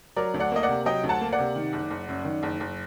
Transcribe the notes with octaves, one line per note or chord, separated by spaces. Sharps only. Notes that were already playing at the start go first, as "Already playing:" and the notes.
F#3 A#4 D5
D2
D5 F#5
A#3 D#5
D5 F#5
C3
F#3 D#5 G5
D2
F#5 A5
A#3
D5 F#5
C3
D#3
F#1
F#1
F#2
D#3
F#1
F#1